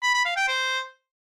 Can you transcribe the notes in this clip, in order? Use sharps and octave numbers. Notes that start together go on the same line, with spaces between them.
B5
B5
F5
G5
C5